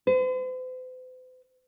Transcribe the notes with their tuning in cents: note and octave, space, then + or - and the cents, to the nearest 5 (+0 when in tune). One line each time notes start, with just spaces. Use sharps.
C5 -45